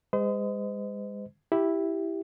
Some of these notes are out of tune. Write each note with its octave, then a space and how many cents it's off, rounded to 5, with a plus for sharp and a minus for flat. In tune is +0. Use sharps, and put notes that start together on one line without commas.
G#3 -35 C5 -40 D#5 +10
E4 +0 G4 +0